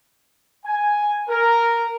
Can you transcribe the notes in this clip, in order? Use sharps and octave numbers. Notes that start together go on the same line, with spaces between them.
G#5
A#4